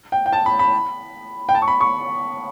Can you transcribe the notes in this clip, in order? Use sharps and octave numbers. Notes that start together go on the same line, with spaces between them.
G5
G5
A5
B5
B5
G5
A5
C#6
B5
C#6